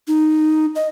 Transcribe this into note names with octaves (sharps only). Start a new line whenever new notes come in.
D#4
D#5